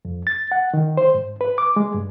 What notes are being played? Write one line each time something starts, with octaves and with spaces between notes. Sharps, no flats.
F2
A6
F#5
D#3
C5
G#2
B4
D6
G#3
G2